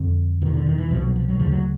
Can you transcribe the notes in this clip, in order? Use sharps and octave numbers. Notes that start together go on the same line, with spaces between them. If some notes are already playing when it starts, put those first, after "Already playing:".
Already playing: F2 D3
E2 B2 D#3
D3
D#3
E3
C2 B2 F3
F#3
F3
F#3
D2 C#3 F3
F#3